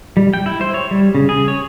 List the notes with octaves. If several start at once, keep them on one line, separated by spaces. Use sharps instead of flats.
G3
G5
E4
C5
C#5
G3
C#3
G#4
C#5